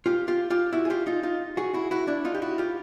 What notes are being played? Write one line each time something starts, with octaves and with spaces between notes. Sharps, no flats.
F4 G4
F4 G4
F4 G4
E4 F#4
G#4
F4 G4
D#4 F4
D#4 F4
F#4 G#4
E4 F#4
E4 F#4
D4 E4
D#4 F4
G4
E4 F#4
F4 G4